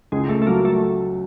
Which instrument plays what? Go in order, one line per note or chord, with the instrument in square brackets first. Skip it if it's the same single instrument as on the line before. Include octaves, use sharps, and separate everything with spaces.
[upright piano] C#2 [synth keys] G#3
[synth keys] A3
A3
[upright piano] F#3 [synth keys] A#3
[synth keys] A3